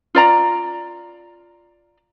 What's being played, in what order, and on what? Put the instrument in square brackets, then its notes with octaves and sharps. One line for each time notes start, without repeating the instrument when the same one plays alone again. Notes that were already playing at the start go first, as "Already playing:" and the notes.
[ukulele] F4 D5 A#5